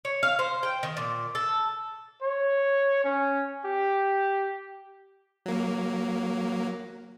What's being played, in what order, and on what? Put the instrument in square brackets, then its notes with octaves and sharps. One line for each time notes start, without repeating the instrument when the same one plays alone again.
[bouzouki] C#5
F5
C5
G5
D#3
A#2
A4
[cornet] C#5
C#4
G4
[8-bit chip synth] F#3 A#3